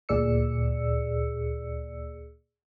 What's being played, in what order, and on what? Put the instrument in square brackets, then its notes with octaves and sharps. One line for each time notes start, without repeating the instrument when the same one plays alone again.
[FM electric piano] D2 A#2 G#4 D5 E6 C#7